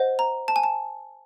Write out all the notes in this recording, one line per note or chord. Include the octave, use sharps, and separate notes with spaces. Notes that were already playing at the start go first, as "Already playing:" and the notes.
Already playing: C5 D#5 F#5
A#5
A5
G#5
A5